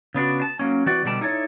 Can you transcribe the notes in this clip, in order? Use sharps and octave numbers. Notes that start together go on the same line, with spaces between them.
C#3 B3 D4 F#4
A5
F#3 A#3 C#4
E3 C4 F#4 D5
B2 D3 G3 D5 A5
D#4 E4 A4 C#5 D5